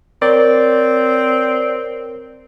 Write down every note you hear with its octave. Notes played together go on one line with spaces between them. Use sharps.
C4 A#4 C#5 D5